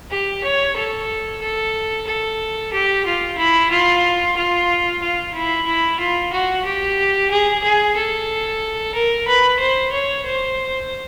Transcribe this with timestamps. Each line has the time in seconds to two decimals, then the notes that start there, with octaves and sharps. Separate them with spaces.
0.10 G4
0.43 C#5
0.76 A4
1.41 A4
2.07 A4
2.72 G4
3.05 F4
3.38 E4
3.71 F4
4.36 F4
5.01 F4
5.34 E4
5.66 E4
5.99 F4
6.32 F#4
6.64 G4
7.30 G#4
7.63 G#4
7.96 A4
8.94 A#4
9.27 B4
9.59 C5
9.92 C#5
10.25 C5